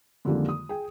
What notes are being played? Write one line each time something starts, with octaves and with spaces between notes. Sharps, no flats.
F2 D3 D#3 G3 G#3 A#3
D#6
G#4 G5